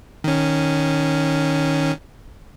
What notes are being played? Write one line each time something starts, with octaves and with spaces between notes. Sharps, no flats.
D#3 C#4